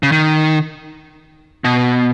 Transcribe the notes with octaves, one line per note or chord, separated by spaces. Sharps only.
C#3
D#3
B2